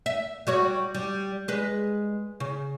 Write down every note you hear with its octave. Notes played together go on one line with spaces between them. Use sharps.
E5
G3 F#4 C#5
G3
G#3 B4
C#3